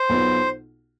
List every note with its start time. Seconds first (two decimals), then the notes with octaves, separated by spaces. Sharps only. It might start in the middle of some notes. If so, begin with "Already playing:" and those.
Already playing: C5
0.09 B1 B2 B3 F4